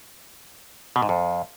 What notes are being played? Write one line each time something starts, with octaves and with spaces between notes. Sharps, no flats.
B2
G#2
F2